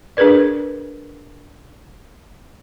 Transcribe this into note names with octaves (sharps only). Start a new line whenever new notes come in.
D4 G#4 A#4 B4 D5